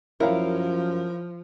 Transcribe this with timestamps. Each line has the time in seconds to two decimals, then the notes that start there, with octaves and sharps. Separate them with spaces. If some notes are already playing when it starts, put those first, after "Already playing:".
0.20 F#2 F3 E4 A#4 C#5 F5